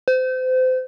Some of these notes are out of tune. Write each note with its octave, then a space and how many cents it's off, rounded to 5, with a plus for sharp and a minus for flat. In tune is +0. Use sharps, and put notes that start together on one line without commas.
C5 -30